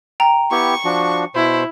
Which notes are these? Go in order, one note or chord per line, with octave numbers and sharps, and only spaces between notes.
G5 A#5
B3 E4 G4 C#6
F3 D4 F#4
B2 E4 C5